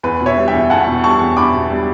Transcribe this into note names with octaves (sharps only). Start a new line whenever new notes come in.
E2 B4
B2
C#5 E5
G3
E5 G5
E2
E2 F#5 A5
B2
G3 A5 C#6
E2
E2 B5 D6
B2
G3